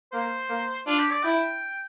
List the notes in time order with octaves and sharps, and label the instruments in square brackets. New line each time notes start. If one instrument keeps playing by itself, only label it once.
[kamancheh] A#3 [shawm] C5
[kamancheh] A#3
[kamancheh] D4 [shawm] F4
[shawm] G4
D5
[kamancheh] E4 [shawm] G5